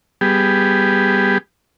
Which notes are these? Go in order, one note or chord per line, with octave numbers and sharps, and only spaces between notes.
G3 B3 G4 G#4